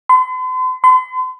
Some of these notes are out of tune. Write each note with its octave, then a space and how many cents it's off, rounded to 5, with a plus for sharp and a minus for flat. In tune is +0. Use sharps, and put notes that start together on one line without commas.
C6 -45
C6 -45